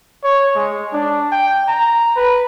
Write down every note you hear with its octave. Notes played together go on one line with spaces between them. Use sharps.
C#5
G#3
D4
G5
A#5
B4